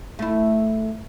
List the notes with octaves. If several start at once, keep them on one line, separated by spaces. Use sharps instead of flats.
A3 E4